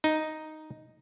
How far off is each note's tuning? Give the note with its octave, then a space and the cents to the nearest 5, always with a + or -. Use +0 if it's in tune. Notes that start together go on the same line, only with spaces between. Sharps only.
D#4 +0